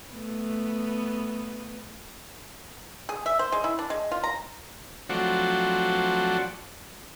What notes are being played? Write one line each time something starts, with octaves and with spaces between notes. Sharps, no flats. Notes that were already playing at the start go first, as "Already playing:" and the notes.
A3 B3
G#4
E5
C5
G#3
E4
D4
G#3
F4
A#5
F3 F#3 A3 C4 D4 F#4